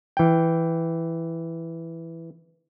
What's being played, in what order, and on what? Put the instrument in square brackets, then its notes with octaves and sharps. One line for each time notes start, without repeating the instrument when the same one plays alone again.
[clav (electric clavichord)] E3 G5